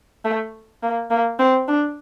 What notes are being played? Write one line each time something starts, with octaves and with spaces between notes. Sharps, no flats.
A3
A#3
A#3
C4
D4